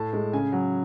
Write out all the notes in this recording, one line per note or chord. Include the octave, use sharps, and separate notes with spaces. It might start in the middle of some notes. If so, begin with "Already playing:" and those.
Already playing: A2 A5
G#3
C#3 G#5
F#3